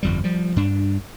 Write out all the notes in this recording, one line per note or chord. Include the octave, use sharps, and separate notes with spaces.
G1 F2 G3
F3 G3
G2 D4